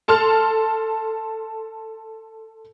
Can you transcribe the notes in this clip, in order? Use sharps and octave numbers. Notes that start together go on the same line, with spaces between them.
A4 A5 C6 F6